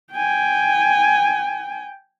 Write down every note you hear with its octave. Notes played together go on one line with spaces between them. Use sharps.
G5 G#5